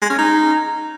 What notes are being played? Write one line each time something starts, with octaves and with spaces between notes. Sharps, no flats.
G#3
C#4
D#4